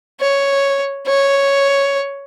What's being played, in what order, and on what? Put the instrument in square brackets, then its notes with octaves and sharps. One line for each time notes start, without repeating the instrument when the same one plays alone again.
[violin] C#5
C#5